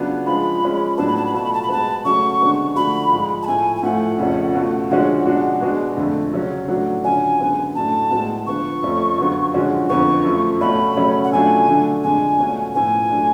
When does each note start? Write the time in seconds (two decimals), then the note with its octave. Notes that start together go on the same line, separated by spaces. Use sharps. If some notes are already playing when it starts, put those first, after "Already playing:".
Already playing: C#3 F#3 B3 D4 F4
0.26 F3 G#3 D4 F4 B5
0.62 F3 G#3 C#4
0.98 A2 F#3 B3 D4 A5
1.07 B5
1.16 A5
1.26 B5
1.33 B2 A3 F4 A5
1.44 B5
1.53 A5
1.62 B5
1.69 B2 G#3 B3 A5
2.04 C#3 F#3 A3 C#4 F#4 C#6
2.41 D3 G#3 B3 D4 F#4
2.75 D3 F3 A3 D4 F#4 B5
3.12 G#2 F3 G#3
3.43 A5
3.47 A2 F3 A3 G#5
3.76 G#5
3.83 A2 F3 A3 F4 F#5
4.18 F2 C#3 F3 A3 C#4
4.54 B2 A3 F4
4.90 D3 F3 G#3 C#4 F#4 F#5
5.25 B2 G#3 D4 F#4
5.61 B2 G#3 B3 D4 F#4
5.96 F2 D3 F3 A3
6.33 C#3 F#3 C#4 F#4
6.68 A2 F#3 A3 D4 F#4
7.04 D3 F#3 C#4 F4 G#5
7.40 F#2 D3 G#3 B3
7.75 A2 F#3 A3 D4 A5
8.11 A2 G#3 B3 F#4
8.47 D3 F3 B3 C#6
8.83 F2 F3 A3 C#4 F4
9.18 F#2 D3 F#3 B3 F4
9.54 D3 F3 G#3 C#4 F#4
9.89 F2 D3 F3 B3 C#6
10.25 F#2 F3 A3
10.61 B2 A3 C#4 F4 B5
10.96 C#3 F#3 A3 C#4
11.24 F#5
11.32 B2 F#3 A3 D4 F4 G#5
11.68 D3 F#3 A3 D4
12.04 F2 D3 G#3 D4 G#5
12.39 B2 A3 C#4 F4
12.75 A2 F3 B3 G#5
13.10 F#3 A3 D4